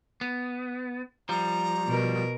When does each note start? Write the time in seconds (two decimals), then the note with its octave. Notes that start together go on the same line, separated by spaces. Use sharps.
0.21 B3
1.29 F3 G3 A#5
1.87 B2 A#4